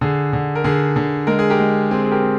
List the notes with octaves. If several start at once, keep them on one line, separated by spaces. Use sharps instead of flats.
D3 G#4
D3
A#4
D3 G#4
D3
G#3 A#4
G#4
G4 A#4
G#3
C4 G#4
G#4
G4 A#4
C4